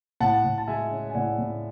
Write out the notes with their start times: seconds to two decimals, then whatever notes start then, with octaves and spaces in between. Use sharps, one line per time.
0.20 A2 F#5 A5
0.44 A2
0.58 A5
0.68 G#3 E5 G#5
0.91 C#4
1.09 G#5
1.14 A2 D5 F#5
1.39 A2